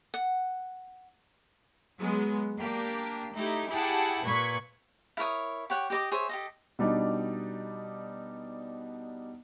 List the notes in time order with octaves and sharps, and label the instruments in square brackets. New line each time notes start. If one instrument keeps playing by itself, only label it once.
[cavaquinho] F#5
[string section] F#3 G#3 B3
A#3 D4 G4
A3 D#4 E4 G4
E4 G4 G#4 F#5 G5 A5
A#2 B4 C#6 G#6 B6
[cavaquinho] E4 A#4 C#5 D#6
G4 C#5 F#5 G5
G4 D#5 D6
G#4 C5 C#5 E5
G4 A4 D#5
[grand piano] B2 G3 D4 D#4